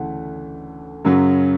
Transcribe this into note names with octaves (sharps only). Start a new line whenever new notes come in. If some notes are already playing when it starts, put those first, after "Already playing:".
Already playing: D2 C#3 E3 A3 F#5
F#2 C#3 F#3